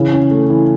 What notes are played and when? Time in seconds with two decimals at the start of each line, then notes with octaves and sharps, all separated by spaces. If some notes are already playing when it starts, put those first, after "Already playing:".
Already playing: C#3 E3
0.13 C#4
0.31 A3
0.50 E3